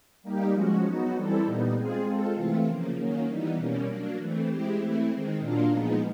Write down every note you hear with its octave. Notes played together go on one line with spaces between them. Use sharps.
G3 A#3 D#4 G4
F3 G#3 C#4 F#4
F#3 B3 D#4 F#4
E3 G3 C4 E4 A4
A#2 G3 B3 D#4
G#3 C4 F4 G#4
G#3 C4 F4 A4
C3 E3 A3 C4 F4
C#3 F3 A#3
D#3 F#3 A#3 C#4
E3 G3 B3 D#4
B2 G3 A#3 C#4
F#3 A#3 D4
E3 A3 C4
G#3 C4 E4 G4
E3 A3 C4 E4
D#3 G#3 C4
A#2 F#3 A#3 D4 F4
A#2 F3 G#3 B3 D#4